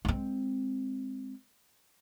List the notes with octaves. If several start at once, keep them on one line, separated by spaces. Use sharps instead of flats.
G#3 C4